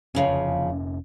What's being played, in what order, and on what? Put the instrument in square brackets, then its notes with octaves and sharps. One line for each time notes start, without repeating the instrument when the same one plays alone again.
[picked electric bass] F1 C#4 [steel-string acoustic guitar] E2 C#3 F3